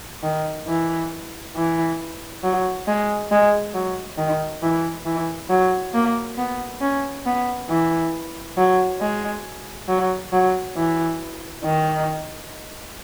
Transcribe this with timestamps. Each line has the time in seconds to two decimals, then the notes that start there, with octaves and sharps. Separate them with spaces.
0.23 D#3
0.68 E3
1.56 E3
2.44 F#3
2.87 G#3
3.31 G#3
3.74 F#3
4.18 D#3
4.62 E3
5.06 E3
5.50 F#3
5.94 A#3
6.38 B3
6.81 C#4
7.26 B3
7.69 E3
8.58 F#3
9.01 G#3
9.89 F#3
10.32 F#3
10.76 E3
11.64 D#3